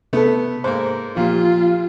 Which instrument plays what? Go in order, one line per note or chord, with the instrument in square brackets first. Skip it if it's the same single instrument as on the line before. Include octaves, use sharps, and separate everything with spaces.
[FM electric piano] C3 A4 [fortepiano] A3 B3
[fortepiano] G#2 A#3 [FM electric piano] C5
[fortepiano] A#2 [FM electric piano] F3 A#3 G4 [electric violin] F4